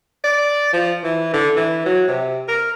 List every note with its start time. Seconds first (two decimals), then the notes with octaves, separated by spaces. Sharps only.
0.24 D5
0.73 F3
1.03 E3
1.33 D3
1.56 E3
1.85 F#3
2.08 C3
2.48 A#4